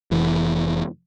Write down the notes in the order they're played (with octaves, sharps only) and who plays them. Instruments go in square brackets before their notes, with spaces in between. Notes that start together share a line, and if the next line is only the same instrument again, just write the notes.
[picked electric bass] F1 E3